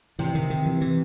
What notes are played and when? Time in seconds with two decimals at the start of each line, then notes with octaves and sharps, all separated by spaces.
0.19 C3 E3
0.35 D#3
0.50 D#3
0.66 E3
0.81 E3